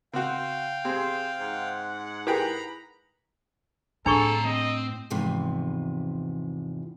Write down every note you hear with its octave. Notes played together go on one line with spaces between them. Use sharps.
C#3 C4 F#4 F5 G5
C4 G4 G#4 C5
G#2 F#5
E4 G4 G#4 A#4 B4 G5 A#5 B5
A2 C4 D4 G#4 A4 A#5 C#6
C4 D#5
E2 G#2 C3 E3 F3